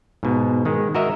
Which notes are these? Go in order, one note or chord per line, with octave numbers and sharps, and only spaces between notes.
G#2 B2
D#3 G#3
F#4 A#4 D#5 E5